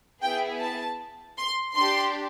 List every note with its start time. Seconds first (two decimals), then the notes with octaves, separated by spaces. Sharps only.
0.22 B3 E4 G#4 G5
0.61 A5
1.38 C6
1.75 D4 G4 C6